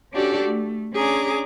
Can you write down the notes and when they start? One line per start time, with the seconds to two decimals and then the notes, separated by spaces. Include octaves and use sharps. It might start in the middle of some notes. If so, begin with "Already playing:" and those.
0.13 C#4 D4 F#4 G4 A4 D5
0.45 A3
0.94 C#4 D4 G#4 A#5 D6